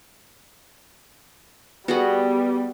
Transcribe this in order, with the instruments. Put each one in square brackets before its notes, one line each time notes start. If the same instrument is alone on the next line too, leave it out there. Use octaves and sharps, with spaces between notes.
[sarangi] G3 [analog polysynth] B3 [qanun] F#4 G#4 F#5